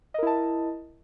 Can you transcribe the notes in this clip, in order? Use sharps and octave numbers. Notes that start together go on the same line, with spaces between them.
E4 A#4 D#5 A5